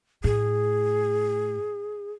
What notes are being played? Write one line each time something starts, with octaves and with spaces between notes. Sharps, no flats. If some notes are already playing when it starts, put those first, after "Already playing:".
A2 G#4